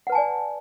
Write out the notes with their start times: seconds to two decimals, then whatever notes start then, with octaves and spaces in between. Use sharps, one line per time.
0.07 F#5
0.10 B4
0.12 A5
0.15 G#5
0.18 D5